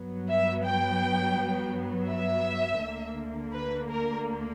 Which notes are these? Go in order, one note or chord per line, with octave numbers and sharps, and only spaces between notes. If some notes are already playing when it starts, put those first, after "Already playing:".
Already playing: G2 F#3 B3
E5
G5
E5
D2 D3 A#3
B4
A#4